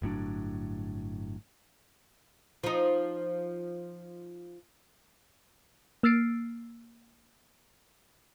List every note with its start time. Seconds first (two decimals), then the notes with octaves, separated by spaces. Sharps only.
0.02 G1 A2 F#3 D4
2.64 F3 D#4
6.03 A#3 E6 F6 A6 C7 D7